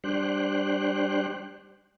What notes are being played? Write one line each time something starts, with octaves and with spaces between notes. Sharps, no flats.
G3 D4 C5 G5 F#6